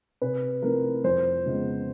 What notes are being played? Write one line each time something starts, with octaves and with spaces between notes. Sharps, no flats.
C3 B4
F3 A3 C4 E4 A#4
F2 C5
C#3 F3 G#3 B3